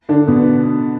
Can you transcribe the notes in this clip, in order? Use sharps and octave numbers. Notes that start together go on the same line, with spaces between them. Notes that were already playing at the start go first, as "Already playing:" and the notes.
D3 D4
B2 B3